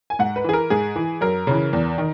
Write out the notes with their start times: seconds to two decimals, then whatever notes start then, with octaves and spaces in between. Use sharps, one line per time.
0.10 G#5
0.19 G#2 F#5
0.36 B4
0.44 E3 G#4
0.53 A#4
0.70 G#2 G#4
0.96 E3
1.21 F#2 A#4
1.47 C#3 E3
1.73 E2
1.98 D#3